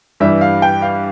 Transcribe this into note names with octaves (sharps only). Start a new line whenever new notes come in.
G2 E3 G3 E5
F5
G5
F5